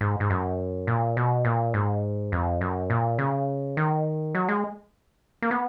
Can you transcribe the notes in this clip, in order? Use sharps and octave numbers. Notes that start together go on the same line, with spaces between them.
G#2
G#2
F#2
A#2
B2
A#2
G#2
F2
F#2
A#2
C#3
D#3
F#3
G#3
A#3
B3